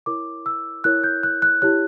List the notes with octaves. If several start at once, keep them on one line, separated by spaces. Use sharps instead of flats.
E4 A#4 C#5 D6
E6
E4 A#4 C#5 F#6
G6
F#6
F#6
E4 G4 C#5 F#6